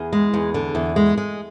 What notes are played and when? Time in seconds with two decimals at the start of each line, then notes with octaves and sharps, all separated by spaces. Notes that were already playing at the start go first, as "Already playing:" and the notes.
Already playing: E2 G#4
0.13 G#3
0.34 E2
0.54 D3
0.75 E2
0.96 G#3
1.17 G#3